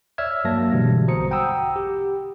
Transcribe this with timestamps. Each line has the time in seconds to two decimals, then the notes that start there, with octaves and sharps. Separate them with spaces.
0.18 C#5 D5 E5 E6 F6 G#6
0.44 G2 F#3 A#3 A5 A#6
0.72 G2 B2 D3 E3 G3 G#3
1.08 A#1 F#4 C5 A#5 D#6 C#7
1.31 F#5 G5 A#5 B5 D#6 E6
1.76 G4